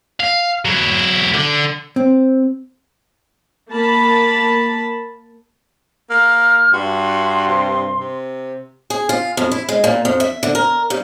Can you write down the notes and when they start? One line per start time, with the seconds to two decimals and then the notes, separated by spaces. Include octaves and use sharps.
0.20 F5
0.65 F#3 E4
1.34 D3
1.96 C4
3.71 A#3 A5 B5
6.10 A#3 F6
6.73 G2 F#4 C6
7.47 C3
8.00 C3
8.90 G#4
9.09 F4
9.37 F2
9.51 E4
9.69 G#3
9.84 A#2
10.05 F2
10.20 E5
10.43 D3
10.55 A#4
10.90 G2